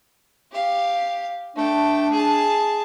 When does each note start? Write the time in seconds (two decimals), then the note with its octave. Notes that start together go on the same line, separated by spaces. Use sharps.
0.52 G4 F5
1.56 A3 D4 G5
2.12 G#4 A5